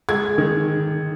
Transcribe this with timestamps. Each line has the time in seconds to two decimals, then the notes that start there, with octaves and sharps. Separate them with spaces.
0.09 G#3 G#6
0.38 D#3